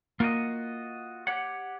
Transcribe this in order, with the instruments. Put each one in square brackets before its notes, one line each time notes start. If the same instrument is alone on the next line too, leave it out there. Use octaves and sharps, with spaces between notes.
[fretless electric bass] A#3 [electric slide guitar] F4 F#4 D#5
[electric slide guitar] G4 C#5 F#5